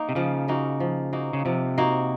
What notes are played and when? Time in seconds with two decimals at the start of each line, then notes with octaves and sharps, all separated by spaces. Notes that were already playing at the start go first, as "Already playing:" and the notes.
Already playing: A#3 D#4
0.09 C3
0.15 C#3 F3
0.48 A#3 D#4 F#4
0.80 F3
1.13 A#3 D#4 F#4
1.33 C#3
1.45 C3 F3
1.78 A#3 D#4 F#4